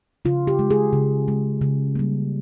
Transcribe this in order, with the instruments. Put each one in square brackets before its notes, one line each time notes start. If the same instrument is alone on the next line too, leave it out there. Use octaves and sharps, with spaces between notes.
[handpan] C#3 F4
G4
G#3
G#4
C#3
G#3
C#3
G3 A#3